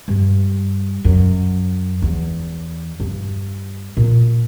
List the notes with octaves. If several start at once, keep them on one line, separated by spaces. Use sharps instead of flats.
G2
F#2
E2
G2
A#2